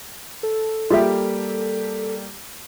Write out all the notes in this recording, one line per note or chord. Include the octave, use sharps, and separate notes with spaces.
A4
G3 A#3 F4 G4 G#4 E5